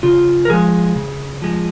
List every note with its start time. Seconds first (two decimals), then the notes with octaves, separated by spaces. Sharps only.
0.03 C#3 F4
0.45 A#4
0.50 F3 G#3 G#4
0.96 C#3
1.42 F3 G#3